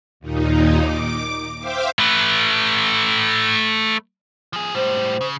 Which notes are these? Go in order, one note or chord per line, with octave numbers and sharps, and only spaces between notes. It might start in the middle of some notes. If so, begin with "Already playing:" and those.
D#2 A#2 D#4
D6
C5 E5 F5 G5 D6
A3 B4
F3 G#4
A2 G3 C5
C#3